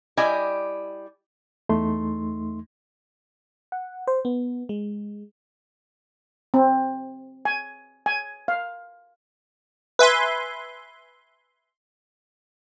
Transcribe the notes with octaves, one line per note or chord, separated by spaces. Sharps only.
G3 E4 D5 D#5 G#5
E2 A3 D#4 C6
F#5
C5
B3
G#3
C4
G#5
G#5
F5
B4 E5 G#5 C6